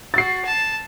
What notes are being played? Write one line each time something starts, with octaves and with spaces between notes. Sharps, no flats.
F#4 A6 C7
A5